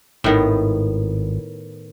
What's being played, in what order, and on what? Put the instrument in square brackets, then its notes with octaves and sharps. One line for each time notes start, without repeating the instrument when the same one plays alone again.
[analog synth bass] G#1 [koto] A2 D#3 B3